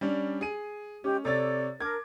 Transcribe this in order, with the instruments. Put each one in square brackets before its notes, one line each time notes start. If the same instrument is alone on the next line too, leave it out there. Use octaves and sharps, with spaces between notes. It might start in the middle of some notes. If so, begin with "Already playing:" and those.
[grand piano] G3 C#4 D4
G#4 D#7
[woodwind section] G#3 G4 [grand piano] C#4
[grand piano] C3 C#5 A6 [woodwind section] A4 D5
[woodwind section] D4 A#4 [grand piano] D6 G#6